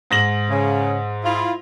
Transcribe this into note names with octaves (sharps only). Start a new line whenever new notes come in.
G#2 A#6 F#7
C#3
E4 F4